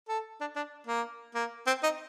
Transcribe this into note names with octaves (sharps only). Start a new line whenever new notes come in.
A4
D4
D4
A#3
A#3
C4
D#4